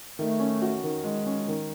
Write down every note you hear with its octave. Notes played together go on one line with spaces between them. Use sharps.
D#3 A3
C#4
F#4
D#3
G#3
C#4
D#3